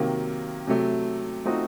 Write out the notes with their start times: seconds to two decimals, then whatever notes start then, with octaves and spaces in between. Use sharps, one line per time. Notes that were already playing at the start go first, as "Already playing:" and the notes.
Already playing: C3 D#3 F#3 A#3
0.67 C3 F#3 A3
1.45 F3 A3 C4 D#4 F#4